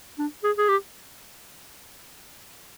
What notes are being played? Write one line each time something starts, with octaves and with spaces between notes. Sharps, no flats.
D4
G#4
G#4
G4